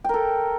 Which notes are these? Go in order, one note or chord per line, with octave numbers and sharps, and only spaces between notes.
A4 A#4 G5